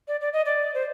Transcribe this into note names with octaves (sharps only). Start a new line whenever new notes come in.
D5
D5
D#5
D5
C5